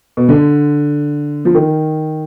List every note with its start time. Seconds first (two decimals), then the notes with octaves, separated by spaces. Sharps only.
0.17 B2
0.29 D3
1.45 F3
1.54 D#3